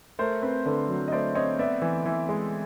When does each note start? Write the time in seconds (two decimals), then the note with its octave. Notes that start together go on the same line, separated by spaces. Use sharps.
0.19 A3 A#4 C5
0.42 C4 A4 B4
0.65 D3 A4 B4
0.89 F#3
1.08 D#5
1.12 A3 C5 D5
1.35 C4 C#5 D#5
1.59 B3 D5 E5
1.82 E3
2.06 E3
2.29 G#3